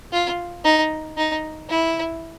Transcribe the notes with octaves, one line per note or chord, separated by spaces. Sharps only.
F4
D#4
D#4
E4